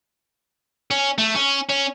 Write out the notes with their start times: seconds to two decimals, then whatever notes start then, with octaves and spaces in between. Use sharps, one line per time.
0.91 C#4
1.18 A3
1.35 C#4
1.69 C#4